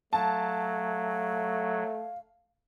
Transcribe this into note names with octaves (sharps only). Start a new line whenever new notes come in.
F#3 A3 F5 A5